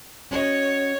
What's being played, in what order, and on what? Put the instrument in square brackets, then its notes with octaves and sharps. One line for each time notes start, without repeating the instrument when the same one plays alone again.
[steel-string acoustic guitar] C#4 F#4 D#5 [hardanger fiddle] C#5